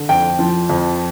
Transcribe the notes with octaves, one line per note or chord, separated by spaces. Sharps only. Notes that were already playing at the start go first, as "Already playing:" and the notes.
Already playing: D3
F2 G5
F3
F2